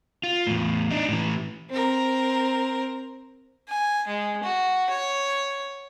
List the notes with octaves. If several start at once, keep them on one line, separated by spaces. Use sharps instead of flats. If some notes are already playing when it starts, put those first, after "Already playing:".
F4
E2 A2
D4 D#4
A2 E3
C4 A#4
G#5
G#3
F#4
C#5